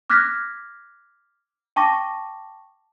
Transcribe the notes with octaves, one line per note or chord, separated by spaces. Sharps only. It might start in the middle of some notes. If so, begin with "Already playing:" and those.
D6 F6 F#6 G#6 A#6 B6
G5 A5 C#6 D6 A#6